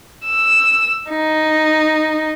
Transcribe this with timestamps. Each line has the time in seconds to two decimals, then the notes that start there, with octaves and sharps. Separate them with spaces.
0.25 E6
1.11 D#4